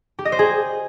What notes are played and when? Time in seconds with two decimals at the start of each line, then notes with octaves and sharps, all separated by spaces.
0.19 G4
0.25 D#5
0.32 C5
0.39 G#4